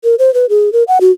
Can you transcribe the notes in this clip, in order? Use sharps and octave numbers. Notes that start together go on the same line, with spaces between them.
A#4
C5
B4
G#4
A#4
F#5
F#4